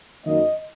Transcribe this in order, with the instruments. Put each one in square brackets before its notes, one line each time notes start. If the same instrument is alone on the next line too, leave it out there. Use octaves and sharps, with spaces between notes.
[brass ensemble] F#2 D#3 A#3 D#5